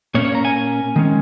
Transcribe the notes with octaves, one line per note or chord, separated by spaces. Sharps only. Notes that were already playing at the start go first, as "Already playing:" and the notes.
A#2 A#3 C#4 C#5
C#5
A#5
G#5
D#3 G#3 C#4